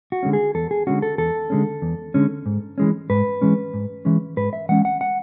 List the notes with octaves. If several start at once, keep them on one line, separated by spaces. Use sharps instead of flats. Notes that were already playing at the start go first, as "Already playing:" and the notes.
F#4
D3 G#3 C#4
G#4
E2 A4
G#4
D3 G#3 C#4 F#4
A4
E2 A4
D3 G#3 C#4
E2
D3 G#3 C#4
G#2
E3 G#3 C#4
G#2 B4
E3 G#3 C#4
G#2
E3 G#3 C#4
G#2 B4
E5
E3 G#3 C#4 F#5
F#5
F#5